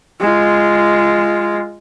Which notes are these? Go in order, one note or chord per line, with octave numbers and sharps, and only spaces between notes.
G#3 F4